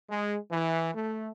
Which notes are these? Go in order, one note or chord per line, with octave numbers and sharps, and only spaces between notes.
G#3
E3
A3